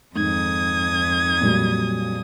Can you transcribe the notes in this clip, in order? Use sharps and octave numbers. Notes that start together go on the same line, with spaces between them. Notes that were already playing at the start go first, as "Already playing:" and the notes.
F2 G#2 D#3 D#6 G#6
A#2 F#3 G3